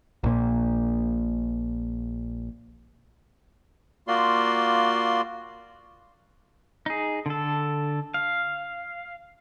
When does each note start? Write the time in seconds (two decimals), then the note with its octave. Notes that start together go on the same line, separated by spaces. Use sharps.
0.24 A#1 A#2
4.08 A#3 F4 F#4 D5 C6
6.86 D#4 G#4
7.26 D3 A4
8.14 F5